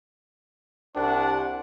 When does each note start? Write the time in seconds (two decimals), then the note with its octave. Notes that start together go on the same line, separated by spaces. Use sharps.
0.96 C2 D4 C5 F#5